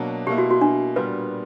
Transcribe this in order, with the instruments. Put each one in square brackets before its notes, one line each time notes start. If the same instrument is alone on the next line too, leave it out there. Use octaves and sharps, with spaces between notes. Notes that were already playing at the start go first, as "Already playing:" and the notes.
Already playing: [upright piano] B2 F#3 A#3 D4 F#4
[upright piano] B2 A#3 E4 [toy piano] G4
[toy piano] F#4
F#4
D4
[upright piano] A#2 G3 B3 [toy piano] B4